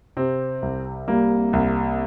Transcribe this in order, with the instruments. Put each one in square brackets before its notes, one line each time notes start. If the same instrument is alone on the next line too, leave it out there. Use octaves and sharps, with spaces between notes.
[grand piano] C3 C4
C2
G3 A#3
C2